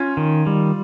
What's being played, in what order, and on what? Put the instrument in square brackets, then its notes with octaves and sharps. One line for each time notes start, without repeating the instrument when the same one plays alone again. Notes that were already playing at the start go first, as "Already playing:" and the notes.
Already playing: [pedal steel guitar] C#4 [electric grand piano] F4
[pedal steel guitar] D#3
G3